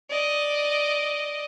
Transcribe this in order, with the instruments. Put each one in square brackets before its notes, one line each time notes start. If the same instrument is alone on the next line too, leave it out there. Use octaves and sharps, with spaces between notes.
[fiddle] D5 D#5